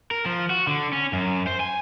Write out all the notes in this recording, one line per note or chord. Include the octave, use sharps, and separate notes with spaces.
A#4
F3
F#4
D3
C#4
F#2
C5
G#5